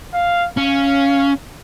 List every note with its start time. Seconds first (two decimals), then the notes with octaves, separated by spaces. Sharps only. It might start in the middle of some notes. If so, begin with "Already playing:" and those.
0.14 F5
0.57 C#4 F5